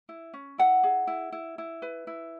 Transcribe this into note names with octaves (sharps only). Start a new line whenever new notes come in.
E4
C#4
E4 F#5
G#4
E4
E4
E4
B4
E4